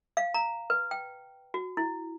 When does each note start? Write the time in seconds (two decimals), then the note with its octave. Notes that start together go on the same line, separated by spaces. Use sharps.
0.17 F5
0.34 A#5
0.70 B4
0.91 G5
1.54 F#4
1.77 E4